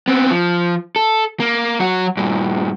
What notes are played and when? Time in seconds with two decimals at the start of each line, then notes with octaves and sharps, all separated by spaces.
0.08 B3 C4
0.31 F3
0.96 A4
1.40 A#3
1.80 F#3 F#4
2.17 G2 A#2